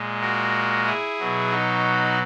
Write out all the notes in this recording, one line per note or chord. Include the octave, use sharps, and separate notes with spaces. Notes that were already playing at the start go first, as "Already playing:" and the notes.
Already playing: A#2 G#3
F#4 A#4
E4 G#4
B2 F#3
D#4 F#4